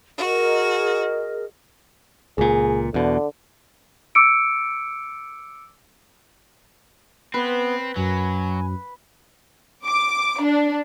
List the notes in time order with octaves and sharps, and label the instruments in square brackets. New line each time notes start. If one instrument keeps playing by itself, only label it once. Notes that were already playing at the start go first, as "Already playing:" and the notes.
[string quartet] F#4 [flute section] G#4 A#4 D#5
[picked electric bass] C#2 A#2 [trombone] G#4
[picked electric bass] E2 B2 [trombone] D3
[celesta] D6 E6 C#7 D7
[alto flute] B3 [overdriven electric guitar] C4 [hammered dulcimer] B4
[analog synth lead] F#2 [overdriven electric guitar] F#3 [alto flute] G#5
[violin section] D6
D4